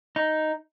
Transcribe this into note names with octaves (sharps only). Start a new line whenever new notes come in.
D#4